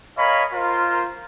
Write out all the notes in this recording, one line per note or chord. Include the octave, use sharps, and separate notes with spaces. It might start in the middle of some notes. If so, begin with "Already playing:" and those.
A#4 C#5 D#5 F5 G#5 B5
F4 A#4 C5